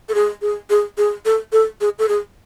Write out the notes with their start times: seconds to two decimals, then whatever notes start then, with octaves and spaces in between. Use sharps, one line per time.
0.09 A4
0.14 G#4
0.42 G#4
0.70 G#4
0.98 G#4
1.25 A4
1.52 A4
1.81 G#4
1.99 A4
2.08 G#4